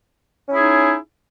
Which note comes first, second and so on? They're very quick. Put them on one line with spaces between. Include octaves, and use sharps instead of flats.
C#4 E4 G#4 D#4